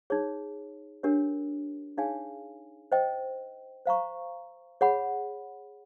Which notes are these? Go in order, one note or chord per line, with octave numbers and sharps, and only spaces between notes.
D#4 G#4 C#5
D4 G4 A#4 C#5
D#4 G#4 C#5 F5 G#5
C5 D#5 G5
C5 F5 A#5 C#6
G#4 C#5 F#5 B5